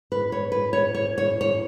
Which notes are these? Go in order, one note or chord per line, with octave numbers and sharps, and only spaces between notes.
B4
C#5
B4
C#5
C#5
C#5
C#5